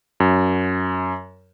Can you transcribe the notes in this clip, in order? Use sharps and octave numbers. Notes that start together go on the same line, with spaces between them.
F#2